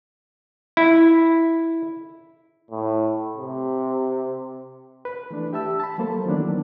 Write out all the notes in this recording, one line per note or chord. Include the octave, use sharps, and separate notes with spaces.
E4
A2
C3
B4
E3 A3 D4
G4 E5 A5 E6
A5 B5
F#3 A3 A#3 A4 C5
D#3 E3 F#3 A#3 B3 D4